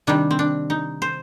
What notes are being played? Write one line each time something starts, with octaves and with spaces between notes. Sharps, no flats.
C3 D#3 G3 D4
C4
D4
D#4
C5